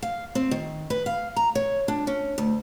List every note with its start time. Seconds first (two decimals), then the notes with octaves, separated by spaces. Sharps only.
0.02 F5
0.35 C4
0.51 D#3
0.90 B4
1.06 F5
1.36 A#5
1.55 C#5
1.88 D4
2.07 C#4
2.38 D2